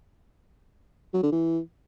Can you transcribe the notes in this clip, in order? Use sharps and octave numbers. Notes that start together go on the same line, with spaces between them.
F#3
D3
E3